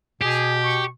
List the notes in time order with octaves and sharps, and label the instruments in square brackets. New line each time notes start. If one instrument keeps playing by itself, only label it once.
[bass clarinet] B2 [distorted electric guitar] G4 [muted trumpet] G#4
[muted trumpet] C#6